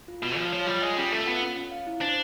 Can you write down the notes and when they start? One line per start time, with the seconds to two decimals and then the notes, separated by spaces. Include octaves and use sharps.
0.08 F4
0.23 B2 F4
0.37 F3 F4
0.53 F3 C#5
0.67 G3 F4
0.82 G#3 F4
0.97 G3 C#4
1.12 A3 A4
1.27 B3 F4
1.42 C#4
1.56 C#4
1.71 F5
1.87 E4
2.01 D4 C5